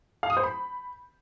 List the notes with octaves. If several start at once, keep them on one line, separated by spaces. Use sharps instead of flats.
F5
D#6
C5
B5